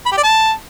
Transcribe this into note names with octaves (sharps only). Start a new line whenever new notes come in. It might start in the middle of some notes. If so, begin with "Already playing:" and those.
B5
G4
D5
A5